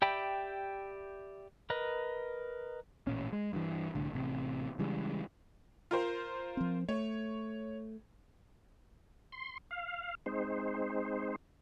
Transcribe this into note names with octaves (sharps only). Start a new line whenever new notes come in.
G4 D5 E5 G5 B5
A#4 B4 D#5
A1 A#2 C#4
G#3
G2 E3
C2 A2 D3
A1 C3
C#3 E3 G3 G#3
F4 A#4 C5
F3 C4
A3 C#5
C6
F5
G#3 C4 D#4 C5